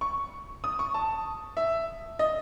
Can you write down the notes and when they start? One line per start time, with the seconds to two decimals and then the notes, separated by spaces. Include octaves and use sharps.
0.01 C#6
0.64 D#6
0.79 C#6
0.94 A5
1.57 E5
2.19 D#5